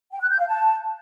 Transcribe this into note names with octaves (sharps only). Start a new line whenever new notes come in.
G5
F#6
G6
F5
A5